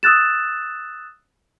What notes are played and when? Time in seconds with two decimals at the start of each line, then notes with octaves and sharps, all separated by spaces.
0.03 D#6 E6 F#6 A6 E7